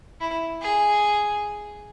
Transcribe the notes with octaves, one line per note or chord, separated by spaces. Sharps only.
E4
G#4